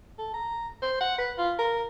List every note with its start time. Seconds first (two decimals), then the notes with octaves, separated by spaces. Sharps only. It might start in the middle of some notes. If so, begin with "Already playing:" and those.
0.18 A4
0.34 A#5
0.82 C5
1.01 F#5
1.18 B4
1.38 F4
1.59 A#4